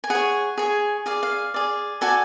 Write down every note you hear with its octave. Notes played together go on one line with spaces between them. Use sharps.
G#5
G#4 C#5 F#5
G#4 C#5
G#4 D5 F5
F5
G#4 D5
F#4 A4 D5 G#5